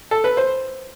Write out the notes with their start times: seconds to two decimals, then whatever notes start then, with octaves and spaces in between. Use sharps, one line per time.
0.11 A4
0.24 B4
0.37 C5